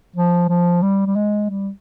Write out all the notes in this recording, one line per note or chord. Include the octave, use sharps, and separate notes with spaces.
F3
F3
G3
G3
G#3
G3